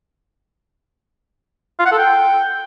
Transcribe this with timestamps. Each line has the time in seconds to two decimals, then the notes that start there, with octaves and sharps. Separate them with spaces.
1.80 F4
1.86 F#5
1.92 A4
1.98 G5